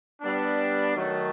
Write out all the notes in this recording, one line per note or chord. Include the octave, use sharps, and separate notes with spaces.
G3 B3 D4
D#3 F#3 A3